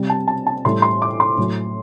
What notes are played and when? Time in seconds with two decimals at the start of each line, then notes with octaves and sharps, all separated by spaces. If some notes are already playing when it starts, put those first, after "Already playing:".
Already playing: C3 G3
0.10 A5
0.28 A5
0.47 A5
0.65 A2 E3 G3 C6
0.82 C6
1.02 D6
1.20 C6
1.37 A2 F#3